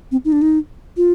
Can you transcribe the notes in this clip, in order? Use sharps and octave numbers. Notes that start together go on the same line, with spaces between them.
C4
D#4
D4
D#4
F4